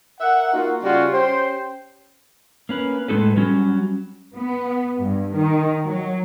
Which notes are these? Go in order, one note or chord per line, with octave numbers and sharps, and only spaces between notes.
A#4 E5 F#5
A#3 D#4 F4 F#4
C#3 G3 C#4 F4 F#4
C#4 G4 C5
A#3 C#4 B4
A2 G#3 D#4 A4 B4
F#3 G3 C#4
B3
G2
D#3
F#3